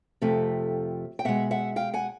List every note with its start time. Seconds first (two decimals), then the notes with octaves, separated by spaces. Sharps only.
0.22 F2 C3 F3 A3
1.19 G5
1.25 B2 G#3 E5 F#5
1.51 E5 F#5
1.76 F5 G5
1.93 F#5 G#5